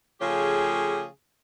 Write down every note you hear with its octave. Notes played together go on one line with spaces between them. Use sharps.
C#3 F3 A3 G4 G#4 C#5